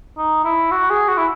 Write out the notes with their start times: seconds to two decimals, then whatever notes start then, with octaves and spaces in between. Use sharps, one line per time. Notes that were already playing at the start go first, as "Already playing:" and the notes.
0.18 D#4
0.44 E4
0.71 F#4
0.90 G#4
1.08 F#4
1.17 E4